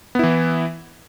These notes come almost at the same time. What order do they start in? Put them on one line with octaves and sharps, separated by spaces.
B3 E4 E3